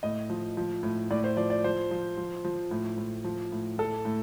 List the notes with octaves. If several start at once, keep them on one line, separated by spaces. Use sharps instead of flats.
A2 D#5
F3
F3
A2
A2 D5
C5
F3 D5
D5
F3 C5
F3
F3
F3
A2
A2
F3
A2
A2 A4
A2